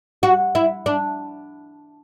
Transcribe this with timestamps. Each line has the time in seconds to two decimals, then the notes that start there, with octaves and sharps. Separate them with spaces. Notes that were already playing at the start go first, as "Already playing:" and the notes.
0.23 F#4
0.55 E4
0.86 D4